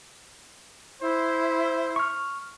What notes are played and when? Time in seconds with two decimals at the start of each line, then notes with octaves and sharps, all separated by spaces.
1.01 E4 C5
1.96 C#6 F6